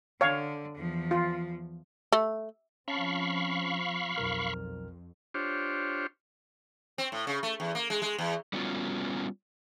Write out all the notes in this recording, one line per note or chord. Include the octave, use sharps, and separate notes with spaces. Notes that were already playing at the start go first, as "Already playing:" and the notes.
D3 C#5 F5
E2 F3
F4
A3
F3 C4 C#4 F5 A5 B5 C#6
B1 F2 A#4 F6
D4 F4 G4 C5 C#5
C4
A2
C#3
A3
E2
A#3
G#3
G#3
E2
G3 B3 C#4 F4 F#4